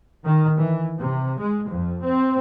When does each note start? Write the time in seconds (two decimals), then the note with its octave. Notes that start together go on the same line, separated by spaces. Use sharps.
0.24 D#3
0.58 E3
0.98 C3
1.40 G#3
1.69 F2
2.04 C4